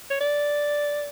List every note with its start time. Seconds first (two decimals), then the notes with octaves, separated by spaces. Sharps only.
0.10 C#5
0.21 D5